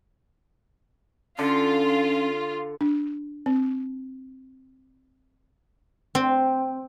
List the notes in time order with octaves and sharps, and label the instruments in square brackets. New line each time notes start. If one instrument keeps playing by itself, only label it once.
[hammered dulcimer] D3 [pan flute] C#4 [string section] F4
[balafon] D4
C4
[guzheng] C4